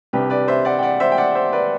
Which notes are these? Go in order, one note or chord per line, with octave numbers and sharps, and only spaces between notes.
C2 C3 G3 D4 G4 B4
B4 D5
C5 E5
D5 F#5
G5
D5 F#5
C5 E5
G5
D5 F#5
C5 E5
B4 D5